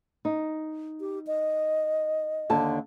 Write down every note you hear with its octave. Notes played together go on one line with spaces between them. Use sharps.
D#4
G4
D#5
D#2 D3 A5